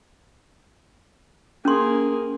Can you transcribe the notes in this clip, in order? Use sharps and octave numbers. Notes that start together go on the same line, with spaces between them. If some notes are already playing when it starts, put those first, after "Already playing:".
A#3 C#4 G#4 C6